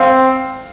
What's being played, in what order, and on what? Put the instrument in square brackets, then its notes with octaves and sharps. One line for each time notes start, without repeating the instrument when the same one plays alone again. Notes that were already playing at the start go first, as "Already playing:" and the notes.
Already playing: [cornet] C4 [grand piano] F5